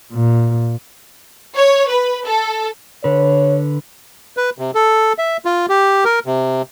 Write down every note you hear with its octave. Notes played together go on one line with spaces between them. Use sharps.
A#2
C#5
B4
A4
D3 B4 C#5
B4
C3
A4
E5
F4
G4
A#4
C3